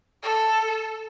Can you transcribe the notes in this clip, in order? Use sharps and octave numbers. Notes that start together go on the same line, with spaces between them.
A4